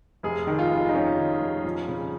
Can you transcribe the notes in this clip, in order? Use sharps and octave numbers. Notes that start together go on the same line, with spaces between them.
F1 G#4
D#3
F4
F1
D#4
F1 C#4
D#3
F1
F3
C#3